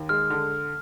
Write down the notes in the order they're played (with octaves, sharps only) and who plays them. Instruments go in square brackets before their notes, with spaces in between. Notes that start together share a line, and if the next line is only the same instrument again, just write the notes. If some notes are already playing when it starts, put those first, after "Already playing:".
Already playing: [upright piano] D#2
[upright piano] G#3 [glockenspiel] F6
[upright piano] D3